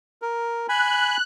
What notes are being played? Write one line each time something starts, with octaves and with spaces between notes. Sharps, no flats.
A#4
G#5 B5 F#6